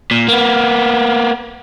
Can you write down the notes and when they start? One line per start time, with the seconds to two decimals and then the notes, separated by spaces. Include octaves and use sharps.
0.11 A#2
0.28 A#3 B3